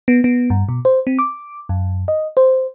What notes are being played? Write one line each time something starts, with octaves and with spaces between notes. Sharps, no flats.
B3
B3
G2
B2
C5
C4
D6
F#2
D#5
C5